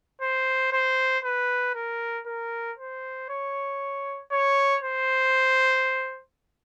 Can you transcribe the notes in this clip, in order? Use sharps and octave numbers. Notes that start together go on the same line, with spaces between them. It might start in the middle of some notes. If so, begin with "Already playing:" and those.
C5
C5
B4
A#4
A#4
C5
C#5
C#5
C5